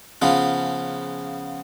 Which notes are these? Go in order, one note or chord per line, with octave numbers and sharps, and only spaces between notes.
C#3 F3 B3 F4